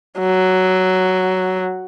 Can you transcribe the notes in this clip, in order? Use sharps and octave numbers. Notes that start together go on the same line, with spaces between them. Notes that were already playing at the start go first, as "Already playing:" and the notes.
F#3